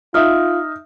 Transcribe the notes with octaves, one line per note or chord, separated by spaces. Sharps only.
D#4 F4 E5 D#6 F6